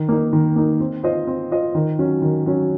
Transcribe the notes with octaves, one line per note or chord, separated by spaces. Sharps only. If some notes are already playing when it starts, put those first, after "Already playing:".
Already playing: D#3
A#3 D#4
D#3
A#3 D#4
C4
F4 C5 D#5
C4
F4 C5 D#5
D#3
F#3 C#4
D#3
F#3 C#4